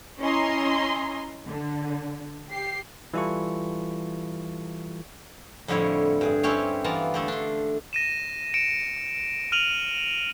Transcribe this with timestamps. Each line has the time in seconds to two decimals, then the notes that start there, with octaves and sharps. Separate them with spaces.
0.20 C#4 E4 D#5 G#5 A#5 C6
1.45 D3
2.50 G4 C7
3.14 E3 G3 E4 F4 A4 C#6
5.68 F2 A2 D3 G3 E4 C#5
6.21 G2 G#4
6.43 C4 C#4 E4 G4 C#5
6.84 E3 B3 F4 D5 A5 A#5
7.14 D3 A3 A4
7.28 D4 C6
7.93 A#6 D#7 E7
8.54 C#7 D7 E7
9.52 F6 D#7 F7 F#7